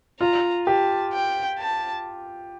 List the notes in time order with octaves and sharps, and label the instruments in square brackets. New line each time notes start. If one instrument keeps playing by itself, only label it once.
[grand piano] F4 [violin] A#5
[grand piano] G4 [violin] A5
[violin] G5
A5